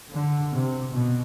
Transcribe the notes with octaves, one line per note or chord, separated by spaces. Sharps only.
D3
C3
B2